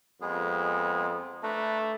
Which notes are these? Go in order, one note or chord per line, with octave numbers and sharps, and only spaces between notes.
F2 G#3 B3 G#4
A3 D4 B4 A#5